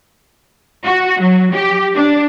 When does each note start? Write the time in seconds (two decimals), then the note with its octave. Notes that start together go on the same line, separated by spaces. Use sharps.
0.84 F#4
1.20 F#3
1.52 G4
1.94 D4